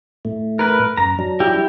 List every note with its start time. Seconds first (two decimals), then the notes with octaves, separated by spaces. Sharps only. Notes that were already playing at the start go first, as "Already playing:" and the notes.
0.25 A2 A3
0.59 A#4 B4
0.97 F#2 A#5
1.19 F#3 D4
1.40 E4 G4